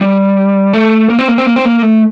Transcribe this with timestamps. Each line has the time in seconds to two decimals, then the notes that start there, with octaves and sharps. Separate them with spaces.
0.01 G3
0.73 A3
1.10 A#3
1.19 C4
1.28 A#3
1.38 C4
1.46 A#3
1.56 C4
1.65 A#3
1.83 A3